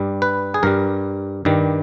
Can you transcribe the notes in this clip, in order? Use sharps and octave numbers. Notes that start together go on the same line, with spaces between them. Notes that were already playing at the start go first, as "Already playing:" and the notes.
Already playing: G2 G3
B4
G#4
G2 G3 A#4
G2 D#3 G3